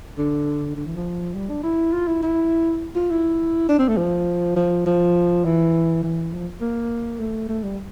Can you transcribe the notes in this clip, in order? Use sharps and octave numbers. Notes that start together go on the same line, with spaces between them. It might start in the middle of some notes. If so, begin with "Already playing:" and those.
D3
D3
E3
F3
G3
D4
E4
F4
E4
E4
F4
E4
D4
C4
A3
F3
F3
F3
E3
E3
F3
A#3
A3
A3
G3